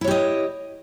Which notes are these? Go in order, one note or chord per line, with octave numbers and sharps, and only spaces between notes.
E4 G4 C#5 D#5